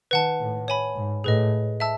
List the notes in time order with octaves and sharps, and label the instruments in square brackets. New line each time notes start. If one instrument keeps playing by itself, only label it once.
[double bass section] D#3 [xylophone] B4 F#5 A5
[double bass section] A2
[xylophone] C#5 G#5 B5
[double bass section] G#2
[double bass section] A2 [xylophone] G#4 B4 D#5
[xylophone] E5 A5 E6